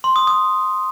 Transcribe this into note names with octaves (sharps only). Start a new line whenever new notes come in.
C6
D#6
D#6